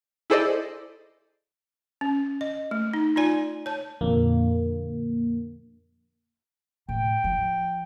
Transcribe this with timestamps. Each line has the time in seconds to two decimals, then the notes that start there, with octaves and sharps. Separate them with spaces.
0.30 E4 G#4 A4 C5 D5 D#5
2.01 C#4
2.41 D#5
2.71 A3
2.94 D#4
3.16 D#4 F4 D5 G#5
3.66 C#5 A5
4.01 F2 A#2 D3 A#3
6.89 A2 G5
7.24 F3